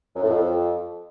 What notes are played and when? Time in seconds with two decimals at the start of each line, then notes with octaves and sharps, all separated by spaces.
0.16 F#2
0.23 A2
0.30 F2